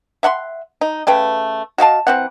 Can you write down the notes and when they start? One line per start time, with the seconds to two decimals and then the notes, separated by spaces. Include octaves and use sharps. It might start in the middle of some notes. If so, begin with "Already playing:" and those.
0.23 E5 F#5 B5 C6
0.81 D#4
1.07 C#3 A3 B4 G5
1.78 F#4 D#5 F5 A5
2.07 E3 C4 F#5